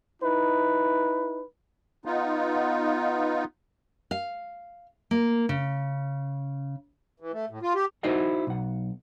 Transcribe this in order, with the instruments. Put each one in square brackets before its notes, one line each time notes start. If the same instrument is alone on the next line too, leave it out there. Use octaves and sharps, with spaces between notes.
[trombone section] D#4 E4 B4
[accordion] B3 D#4 F4
[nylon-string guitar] F5
A#3
C#3
[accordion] E3
A3
A2
F4
G4
[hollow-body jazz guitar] D#4 E4 F#4 C5 D#5 F#5
B1 F#5